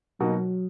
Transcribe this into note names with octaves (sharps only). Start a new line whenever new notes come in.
B2 F#3 A#3 D#4 F#4